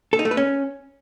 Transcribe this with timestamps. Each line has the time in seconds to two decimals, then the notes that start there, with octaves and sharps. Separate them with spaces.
0.13 A4
0.19 D#4
0.25 A3
0.31 B4
0.37 C#4